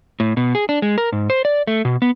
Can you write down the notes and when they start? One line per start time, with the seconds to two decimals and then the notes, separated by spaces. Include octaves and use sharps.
0.20 A2
0.37 B2
0.55 G#4
0.69 D4
0.82 G#3
0.98 A#4
1.12 G#2
1.30 C5
1.45 D5
1.67 A3
1.85 B2
2.02 B3